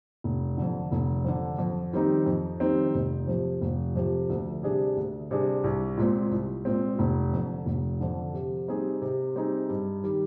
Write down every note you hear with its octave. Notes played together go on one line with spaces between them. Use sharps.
F1
F2 D3
F1
F2 D3
F2
D#3 G3 C4 D#4
F2
D#3 G3 C4 D#4
F1
F2 C3 F3
F1
F2 C3 F3
D2
C3 G3 D4 G#4
D2
C3 G3 D4 G#4
C2
A#2 G#3 C4
C2
A#2 G#3 C4
F1
F2 D3
F1
F2 D3
C3
G3 C4 D#4 G#4
C3
G3 C4 D#4 G#4
G2
D#3 G3